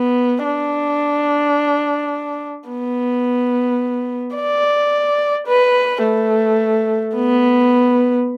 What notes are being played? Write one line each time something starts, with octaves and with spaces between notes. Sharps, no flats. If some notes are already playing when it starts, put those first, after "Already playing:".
Already playing: B3
D4
B3
D5
B4
A3
B3